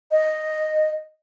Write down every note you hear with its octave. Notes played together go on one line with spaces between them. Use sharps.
D#5